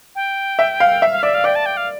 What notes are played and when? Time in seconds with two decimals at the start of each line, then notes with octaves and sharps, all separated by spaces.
0.15 G5
0.59 E5
0.80 F5
1.02 E5
1.12 F5
1.23 D5 E5
1.34 F5
1.44 D5 G5
1.55 A5
1.66 G5
1.77 F5